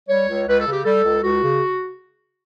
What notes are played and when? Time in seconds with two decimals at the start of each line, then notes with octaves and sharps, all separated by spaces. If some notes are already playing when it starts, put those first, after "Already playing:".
0.08 G3 C#5
0.28 C#2
0.47 C#2 B4
0.60 A4
0.67 C#3
0.72 G4
0.85 G3 A4
1.04 C#2
1.23 C#2 F#4
1.42 C#3